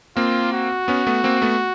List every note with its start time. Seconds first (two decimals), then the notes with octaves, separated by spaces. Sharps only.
0.16 A#3 C4 F4
0.53 F#4
0.88 B3 C#4
1.07 A3 B3
1.24 A#3 C4
1.42 A3 B3